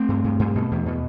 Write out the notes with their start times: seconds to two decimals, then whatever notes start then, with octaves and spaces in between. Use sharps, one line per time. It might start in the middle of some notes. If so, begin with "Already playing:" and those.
Already playing: A3 C4
0.09 G2
0.24 G2
0.39 G2
0.55 B2
0.71 E2
0.86 B2